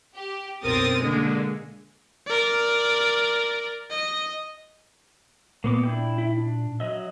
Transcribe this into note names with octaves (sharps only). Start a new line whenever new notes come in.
G4
B1 F#2 C4 A#4 D#6 A6
D3 G#3 A#3
A#4 D5
D#5
A#2 A#3 B3 D6
D4 E4 G5
E4
D4
F#3 D#5 E5